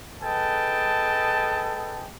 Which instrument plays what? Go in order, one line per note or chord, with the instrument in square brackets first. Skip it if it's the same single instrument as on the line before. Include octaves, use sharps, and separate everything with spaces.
[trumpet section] G#4 A4 B4 D#5 G5 A5